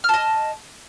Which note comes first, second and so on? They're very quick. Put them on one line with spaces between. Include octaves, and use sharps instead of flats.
F6 A5 D#5